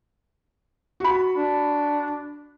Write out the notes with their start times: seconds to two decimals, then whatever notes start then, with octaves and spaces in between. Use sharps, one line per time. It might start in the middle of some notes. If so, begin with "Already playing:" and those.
1.00 F#4 B5
1.36 D4